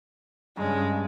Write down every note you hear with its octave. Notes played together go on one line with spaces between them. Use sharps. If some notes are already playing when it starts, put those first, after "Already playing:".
G2 C#3 G#3